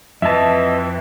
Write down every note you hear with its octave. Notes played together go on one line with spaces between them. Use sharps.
F2 E3 C4 D#5 E5 A5